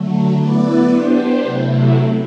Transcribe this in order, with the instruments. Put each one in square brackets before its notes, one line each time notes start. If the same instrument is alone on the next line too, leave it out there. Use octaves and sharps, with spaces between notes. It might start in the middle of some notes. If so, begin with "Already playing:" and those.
Already playing: [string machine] D3 F#3 A3
B3 E4 B4 D5
B3 D4 G4 C5
C3 F#3 A3 E4